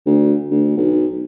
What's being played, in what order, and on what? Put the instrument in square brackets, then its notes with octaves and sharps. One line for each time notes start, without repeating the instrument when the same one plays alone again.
[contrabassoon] D2
D2
B1